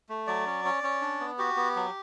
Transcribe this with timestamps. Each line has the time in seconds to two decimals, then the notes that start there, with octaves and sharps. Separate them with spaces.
0.09 A3
0.27 F#3 D5
0.46 C#4
0.65 C#4
0.84 C#4
1.01 D4
1.20 B3
1.38 F#4 G4
1.57 B3
1.76 F#3